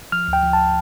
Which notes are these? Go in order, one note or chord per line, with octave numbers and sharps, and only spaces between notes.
F3 F6
D2
G5
F3
A5